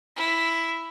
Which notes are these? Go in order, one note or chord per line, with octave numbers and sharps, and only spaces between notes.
E4